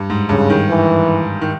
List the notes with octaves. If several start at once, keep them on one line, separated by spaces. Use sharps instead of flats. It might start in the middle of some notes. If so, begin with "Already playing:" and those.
Already playing: G2
G#2
G2 C#3
D#3
E3
D#3